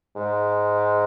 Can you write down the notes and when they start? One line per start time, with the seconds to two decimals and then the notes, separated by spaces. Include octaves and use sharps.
0.17 G#2